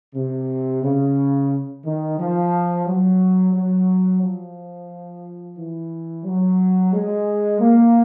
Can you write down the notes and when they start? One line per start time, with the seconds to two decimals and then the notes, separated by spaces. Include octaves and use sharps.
0.15 C3
0.83 C#3
1.84 D#3
2.18 F3
2.86 F#3
3.53 F#3
4.22 F3
5.57 E3
6.25 F#3
6.92 G#3
7.60 A#3